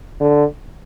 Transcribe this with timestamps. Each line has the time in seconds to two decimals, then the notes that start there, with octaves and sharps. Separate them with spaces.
0.20 D3